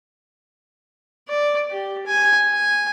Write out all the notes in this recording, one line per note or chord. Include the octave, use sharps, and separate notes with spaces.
D5
G4
G#5
G#5